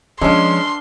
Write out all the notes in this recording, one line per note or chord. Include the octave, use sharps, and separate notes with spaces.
F3 G#3 C#4 D4 F5 C6 E6